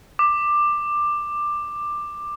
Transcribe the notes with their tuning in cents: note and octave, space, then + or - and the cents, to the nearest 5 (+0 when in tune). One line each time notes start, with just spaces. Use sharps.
D6 +15